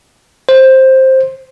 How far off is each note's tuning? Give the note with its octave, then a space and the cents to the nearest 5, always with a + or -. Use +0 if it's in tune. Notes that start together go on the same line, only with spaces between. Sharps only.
C5 +10